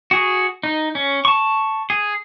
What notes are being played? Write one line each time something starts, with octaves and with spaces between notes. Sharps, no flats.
F#4 G#4
D#4
C#4
A5 C#6
G#4